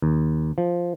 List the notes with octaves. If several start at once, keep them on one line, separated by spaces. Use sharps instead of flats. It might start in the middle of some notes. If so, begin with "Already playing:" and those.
D#2
F3